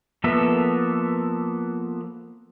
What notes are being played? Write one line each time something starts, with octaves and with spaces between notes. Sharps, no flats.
F3 A#3 B3 A4 E5